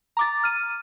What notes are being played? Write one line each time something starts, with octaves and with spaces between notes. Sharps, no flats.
A#5 D6 A6
F6 D#7